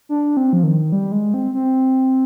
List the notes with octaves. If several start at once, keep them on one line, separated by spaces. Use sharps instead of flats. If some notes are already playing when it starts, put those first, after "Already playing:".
D4
C4
F3
D#3
G3
G#3
C4
C4